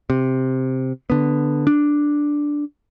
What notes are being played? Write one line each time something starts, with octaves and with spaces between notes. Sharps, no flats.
C3
D3 B3
D4